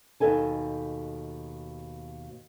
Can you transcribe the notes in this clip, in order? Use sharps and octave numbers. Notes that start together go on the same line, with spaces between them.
D#2 B2 A4 G#5 A5